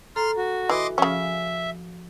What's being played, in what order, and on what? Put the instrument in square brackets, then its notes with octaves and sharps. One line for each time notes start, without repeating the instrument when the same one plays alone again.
[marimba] A4 A#5 [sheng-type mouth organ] C6 F6
[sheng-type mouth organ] F#4
[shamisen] E3 [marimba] F#4 [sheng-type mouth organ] D#5 C6 D6
[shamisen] C#3 C#4 [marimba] F3 [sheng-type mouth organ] E5